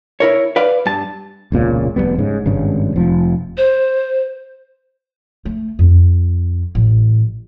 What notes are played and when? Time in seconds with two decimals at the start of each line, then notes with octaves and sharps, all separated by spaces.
0.20 E4 A#4 C#5
0.56 B4 D5 F5
0.86 G2 A5
1.52 E1 C#2 A#2 C#3
1.96 F1 E2 G3 B3
2.18 G#2 C#3
2.46 G#1 G2 C#3
2.96 F1 F3
3.58 C5
5.45 A3
5.79 F2
6.75 A1